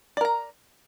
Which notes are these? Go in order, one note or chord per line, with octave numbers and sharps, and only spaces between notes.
A#4 D5 A#5